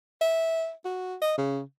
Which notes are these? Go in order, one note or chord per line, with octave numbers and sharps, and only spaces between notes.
E5
F#4
D#5
C#3